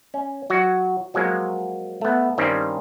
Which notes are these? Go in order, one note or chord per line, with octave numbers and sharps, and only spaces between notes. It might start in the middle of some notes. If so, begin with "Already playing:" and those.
C#4
F#3 F#4
F3 F#3 G#3 A#3
A3 B3
G2 D#3 G3 C4 C#4